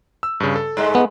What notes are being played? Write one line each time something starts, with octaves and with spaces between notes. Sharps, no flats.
E6
G2 C#3
A4
G2 G#3 A3
B3